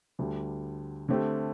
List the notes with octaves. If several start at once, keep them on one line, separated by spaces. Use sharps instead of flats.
D2 D3 G3
D3 A3 C4 G4